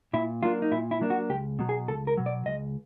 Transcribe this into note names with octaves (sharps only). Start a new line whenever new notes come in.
A#2 E4
F#3 A#3 D4 F4
D#4
A#2 E4
E4
F#3 A#3 D4
F#4
C#2 G4
B2 F#3
G#4
C#2 A4
A#4
B2 F#3
D5
C#2 D#5